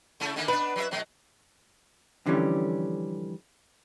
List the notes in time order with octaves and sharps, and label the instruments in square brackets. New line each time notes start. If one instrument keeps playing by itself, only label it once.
[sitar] C#3 A3 E4
D3 D#3 A#3
[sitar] B3 D4 [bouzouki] B4
[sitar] F#3 G3 E5
B2 F#3 A3
[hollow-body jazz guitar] F2 D3 E3 G3 C#4